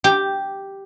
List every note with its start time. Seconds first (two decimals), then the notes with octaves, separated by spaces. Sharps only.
0.04 G4